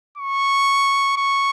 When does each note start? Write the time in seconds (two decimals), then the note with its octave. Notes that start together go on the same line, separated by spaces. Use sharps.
0.17 C#6
1.17 C#6